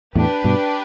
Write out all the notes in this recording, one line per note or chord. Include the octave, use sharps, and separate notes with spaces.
E2 A2 D4 G4 B4
G2 B2